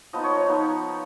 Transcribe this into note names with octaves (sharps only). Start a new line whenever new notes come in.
F3 B3 D#4 D#5
C#5
C#5
F3 B3 D#4